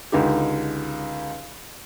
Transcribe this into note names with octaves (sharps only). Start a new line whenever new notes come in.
C#2 D3 D#4 G4